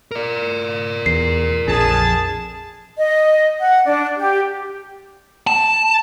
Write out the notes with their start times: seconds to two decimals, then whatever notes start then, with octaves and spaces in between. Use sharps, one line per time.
0.11 A#4 D5
1.06 E2 C7
1.68 A#1 F2 G#4 A5
2.97 D#5
3.59 F#5
3.85 D4
4.17 G4
5.47 A5